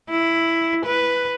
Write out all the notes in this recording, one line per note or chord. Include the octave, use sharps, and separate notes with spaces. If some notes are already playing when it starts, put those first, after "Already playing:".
E4
B4